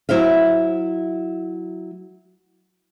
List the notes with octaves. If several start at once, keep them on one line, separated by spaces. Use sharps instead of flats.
F#3 E4 C5 E5 F5